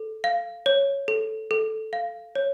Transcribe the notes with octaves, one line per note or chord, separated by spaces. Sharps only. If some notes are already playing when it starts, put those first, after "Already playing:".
Already playing: A4
F5
C#5
A4
A4
F5
C#5